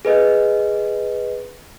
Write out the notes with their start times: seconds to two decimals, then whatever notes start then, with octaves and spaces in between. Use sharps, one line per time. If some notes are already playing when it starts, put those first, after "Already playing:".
0.05 G#4 B4 D#5